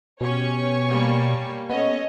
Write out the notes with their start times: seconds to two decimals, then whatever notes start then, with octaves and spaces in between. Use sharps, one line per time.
0.21 B2 C#4 G4 C#5 G#5 C#6
0.89 G3 A#3 A5
1.70 B3 C#4 A4 C#5 D#5